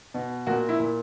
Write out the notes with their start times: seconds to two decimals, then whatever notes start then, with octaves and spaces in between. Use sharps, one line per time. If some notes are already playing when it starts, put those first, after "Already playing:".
0.14 B2
0.47 A#2 F#4
0.69 E4
0.80 A#2